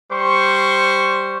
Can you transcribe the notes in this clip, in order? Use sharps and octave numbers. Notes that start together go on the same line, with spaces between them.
G3 C5 C6 C#6